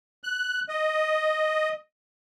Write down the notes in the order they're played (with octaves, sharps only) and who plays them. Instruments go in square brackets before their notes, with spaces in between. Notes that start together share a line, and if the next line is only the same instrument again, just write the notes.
[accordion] F#6
D#5